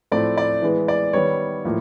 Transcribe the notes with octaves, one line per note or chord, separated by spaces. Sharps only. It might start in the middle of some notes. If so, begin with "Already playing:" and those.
A2 F3 A3 C4 D5
D5
E3 G#3 B3
D5
D#3 G3 B3 C#5
A2 F3 A#3